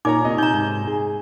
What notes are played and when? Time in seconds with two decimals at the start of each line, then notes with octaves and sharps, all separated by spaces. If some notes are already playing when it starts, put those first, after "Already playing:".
0.05 A#2 D#4 A#4 C#5 A#5 D6
0.24 C3 D#5
0.38 D#4 A#5 G6
0.54 G#2
0.87 G#4